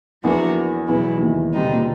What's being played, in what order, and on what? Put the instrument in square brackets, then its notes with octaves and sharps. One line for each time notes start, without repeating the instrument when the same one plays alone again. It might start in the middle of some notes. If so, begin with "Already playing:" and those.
[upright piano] E2 E3 [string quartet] F3 A#3 D4 F#4 A#4
[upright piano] E2 E3 [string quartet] B2 F#3 B3 E4
[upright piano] E3
D#2 D#3
[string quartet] D3 G3 C4 D#4
[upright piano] B2
A#2